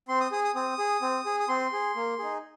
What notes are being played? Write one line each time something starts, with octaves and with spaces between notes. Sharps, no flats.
C4 C6
D#6
G#4 D#6
D#6
C4 D#6
G#4
C4
G#4
D#6
C4 C6
G#4
A#3
D#4 G#4